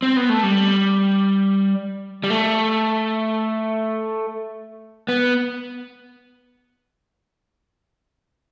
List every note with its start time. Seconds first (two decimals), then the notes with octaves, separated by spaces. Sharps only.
0.02 C4
0.17 B3
0.29 A3
0.43 G3
2.24 G3
2.30 A3
5.08 B3